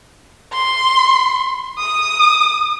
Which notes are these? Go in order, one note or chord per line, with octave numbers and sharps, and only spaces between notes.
C6
D#6